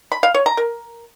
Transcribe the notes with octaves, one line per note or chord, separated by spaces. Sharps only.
B5
F5
C#5
A#5
A#4